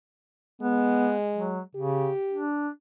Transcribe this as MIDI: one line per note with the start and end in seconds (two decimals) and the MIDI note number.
0.62 1.63 56
0.62 1.12 59
1.35 1.60 54
1.75 2.10 49
1.75 2.45 67
2.32 2.68 62